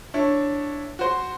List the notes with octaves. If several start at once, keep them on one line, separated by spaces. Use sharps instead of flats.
D4 E4 C#5
F#4 C5